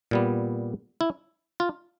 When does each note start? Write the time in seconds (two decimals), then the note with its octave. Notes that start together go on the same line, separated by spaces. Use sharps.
0.11 A#2 G3 B3
1.01 E4
1.60 F4